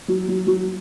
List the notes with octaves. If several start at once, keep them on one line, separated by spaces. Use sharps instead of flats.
F#3
F#3
F#3